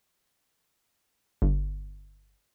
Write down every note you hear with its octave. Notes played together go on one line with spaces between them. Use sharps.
G1